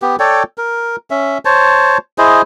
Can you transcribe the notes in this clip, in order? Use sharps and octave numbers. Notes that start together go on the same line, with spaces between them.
B3 G4
A4 C#5 D5 G5
A#4
C#4 E5
C5 C#5 A5
E4 G#4 C5 D#5